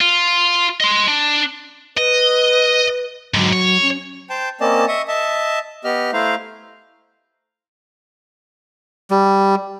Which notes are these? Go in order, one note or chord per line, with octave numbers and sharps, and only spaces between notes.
F4
D#5 C6
D4
B4 D#5
G#2 D3 F#3
C#5
C#4
C5 G5 A5
A#3 C4 C#4 D5 D#5 A5
D#5 E5 C#6 D#6
D#5 E5 A5
B3 G4 D#5 F6
A3 E4 C5 F5 A#5
G3